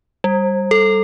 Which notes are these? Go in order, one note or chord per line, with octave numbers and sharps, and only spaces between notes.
G3
A4